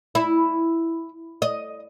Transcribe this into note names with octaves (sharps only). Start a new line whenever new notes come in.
E4
D#5